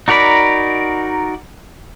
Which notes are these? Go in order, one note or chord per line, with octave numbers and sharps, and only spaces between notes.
D#4 F#4 A#4 D5 B5